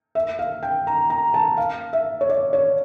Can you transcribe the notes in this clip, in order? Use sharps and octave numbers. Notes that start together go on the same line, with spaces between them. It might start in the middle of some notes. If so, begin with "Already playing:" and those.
E5
F5
G5
A#5
A#5
A5
F5
E5
C#5
D5
C#5